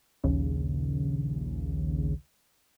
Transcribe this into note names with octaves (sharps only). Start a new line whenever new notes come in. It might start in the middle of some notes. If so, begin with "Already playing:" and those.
A#1 D#2 C#3